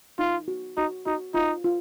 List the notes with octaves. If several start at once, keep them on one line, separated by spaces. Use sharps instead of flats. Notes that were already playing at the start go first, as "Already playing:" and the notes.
D#4 F4
F#4
D#4 F#4
D#4 F#4
D#4 F4
F4